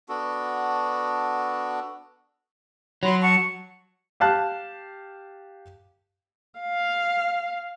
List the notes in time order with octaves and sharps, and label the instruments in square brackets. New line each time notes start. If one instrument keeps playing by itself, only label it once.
[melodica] B3 D4 F#4 A4
[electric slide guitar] F#3 [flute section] B5 C6
[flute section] F#5 A5 C#6
[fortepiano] G4 F5 A5 F#6
[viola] F5